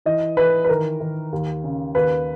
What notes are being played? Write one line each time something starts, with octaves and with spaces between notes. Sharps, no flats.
E3 D#5
E3 B4
B4
D#3 A#4
D#3
D#2
C#3
D#2 B4